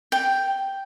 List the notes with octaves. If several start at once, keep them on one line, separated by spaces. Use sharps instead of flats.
G5